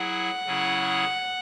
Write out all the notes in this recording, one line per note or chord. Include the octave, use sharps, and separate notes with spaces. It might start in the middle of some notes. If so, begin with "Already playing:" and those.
Already playing: F#3 E4 G#4 F#5
C#3 F#3 C#4 E4 G#4